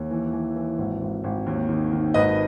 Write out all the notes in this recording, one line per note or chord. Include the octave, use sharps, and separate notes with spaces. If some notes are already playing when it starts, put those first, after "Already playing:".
Already playing: D#2
E3
E3
E3
G#1
G#1
G#1
D#2
D#3
D#3
G#1 B4 D#5